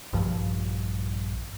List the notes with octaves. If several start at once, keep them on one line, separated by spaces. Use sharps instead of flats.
A#1 G2 F3